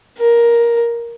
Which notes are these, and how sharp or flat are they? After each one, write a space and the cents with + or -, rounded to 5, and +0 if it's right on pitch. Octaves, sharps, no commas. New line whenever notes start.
A#4 +10